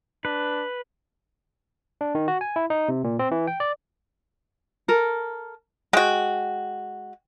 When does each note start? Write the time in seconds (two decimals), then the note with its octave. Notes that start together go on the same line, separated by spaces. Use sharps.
0.25 D4 B4
2.01 D4
2.15 D#3
2.28 F#4
2.41 G#5
2.56 E4
2.70 D#4
2.88 C3
3.04 A#2
3.19 C4
3.31 E3
3.47 G5
3.60 D5
4.88 A4 A#4
5.93 G#3 F#4 G5